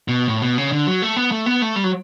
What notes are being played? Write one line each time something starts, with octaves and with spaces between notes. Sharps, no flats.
B2
A2
B2
C#3
D3
F#3
A3
B3
A3
B3
A3
G3
F#3